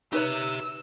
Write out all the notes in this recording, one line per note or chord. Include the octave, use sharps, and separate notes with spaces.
D#4 G4 B4 C#5 E5 E6